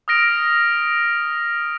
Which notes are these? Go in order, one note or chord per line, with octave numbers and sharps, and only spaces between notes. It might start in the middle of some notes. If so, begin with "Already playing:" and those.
D#6 F6 A#6 D7